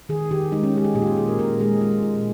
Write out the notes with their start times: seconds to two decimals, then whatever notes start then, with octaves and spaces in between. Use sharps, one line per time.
0.09 D#3 G#4
0.31 D#3 G4
0.52 G#3 D#4
0.63 C#4
0.74 G#3 G4
0.84 G#4
0.95 A#2 G4
1.02 F4
1.07 G4
1.17 A#2 G#4
1.28 A#4
1.38 A#2 A#4
1.60 G#3 G#4
1.81 G#3 F4
2.02 A#2